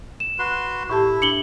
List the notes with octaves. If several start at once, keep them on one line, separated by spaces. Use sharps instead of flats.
E7
F#4 B4 C6
A2 E4 G4 A5
D4 C#7 F#7 G7